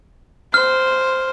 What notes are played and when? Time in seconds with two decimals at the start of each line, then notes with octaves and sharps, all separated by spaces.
0.54 C5 F6